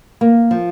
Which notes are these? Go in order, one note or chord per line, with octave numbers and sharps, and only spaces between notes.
A#3
F3